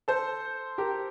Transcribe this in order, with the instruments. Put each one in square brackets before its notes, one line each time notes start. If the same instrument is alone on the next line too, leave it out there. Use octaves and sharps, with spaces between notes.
[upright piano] A4 C5
G4 A#4